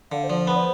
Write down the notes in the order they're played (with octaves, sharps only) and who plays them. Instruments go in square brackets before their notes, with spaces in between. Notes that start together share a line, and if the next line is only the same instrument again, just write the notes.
[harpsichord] D3 [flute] F5
[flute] C5
[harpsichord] F3 [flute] D5
[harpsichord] B3
[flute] C5